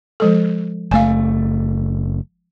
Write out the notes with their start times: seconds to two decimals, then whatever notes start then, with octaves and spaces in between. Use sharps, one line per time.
0.20 F3 G#3 A4
0.91 F#1 A3 F5 G#5